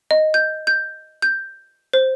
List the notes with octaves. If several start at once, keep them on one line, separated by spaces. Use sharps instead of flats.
D#5
G6
G6
G6
C5